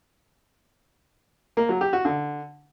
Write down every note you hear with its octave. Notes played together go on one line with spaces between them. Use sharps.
A#3
F#3
G4
F#4
D3